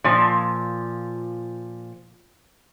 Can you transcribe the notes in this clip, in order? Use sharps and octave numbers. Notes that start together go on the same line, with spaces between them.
A#2 F3